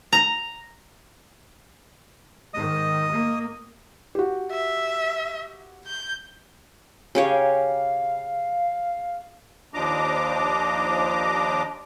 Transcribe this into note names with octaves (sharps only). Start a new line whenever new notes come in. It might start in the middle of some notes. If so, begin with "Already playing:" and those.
A#5
G#2 D#3 D#5 D#6
A#3
F#4 G4
E5
G6
C#3 G4 C#5 F5
D#2 F3 D4 D#5 A#5 D6